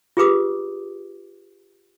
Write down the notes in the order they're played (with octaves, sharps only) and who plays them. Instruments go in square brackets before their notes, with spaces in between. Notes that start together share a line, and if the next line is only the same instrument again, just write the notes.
[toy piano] F4 G4 G#4 B4 D6 D#6